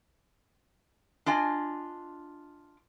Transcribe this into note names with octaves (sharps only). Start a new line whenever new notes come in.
D4 F4 D#5 G#5